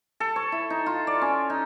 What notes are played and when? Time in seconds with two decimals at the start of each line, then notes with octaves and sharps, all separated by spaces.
0.20 A4
0.36 C#5
0.52 E4
0.70 D#4
0.86 F4
1.07 D5
1.21 C#4
1.50 D#4